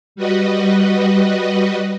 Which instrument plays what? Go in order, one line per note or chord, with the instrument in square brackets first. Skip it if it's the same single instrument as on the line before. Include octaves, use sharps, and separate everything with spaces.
[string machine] G3 F#4 B4 D#5